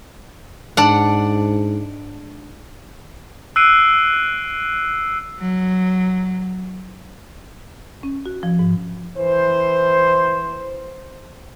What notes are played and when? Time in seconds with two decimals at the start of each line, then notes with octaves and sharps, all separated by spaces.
0.77 G#2 D4 F#5
3.56 E6 F#6 C7 D7 D#7
5.40 F#3
8.03 C#4
8.26 F#4
8.43 F3
8.59 G#2
9.18 E3 C5